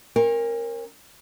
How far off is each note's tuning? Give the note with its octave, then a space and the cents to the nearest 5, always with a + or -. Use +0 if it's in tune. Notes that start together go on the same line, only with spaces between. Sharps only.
C#4 -45 A#4 +0